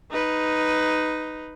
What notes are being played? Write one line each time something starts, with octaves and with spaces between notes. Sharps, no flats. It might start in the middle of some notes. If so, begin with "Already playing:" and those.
D#4 B4